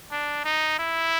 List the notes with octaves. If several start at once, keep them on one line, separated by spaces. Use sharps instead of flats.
D4
D#4
E4